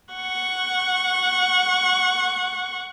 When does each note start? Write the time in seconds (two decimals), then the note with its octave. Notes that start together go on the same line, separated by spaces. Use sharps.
0.14 F#5 C#6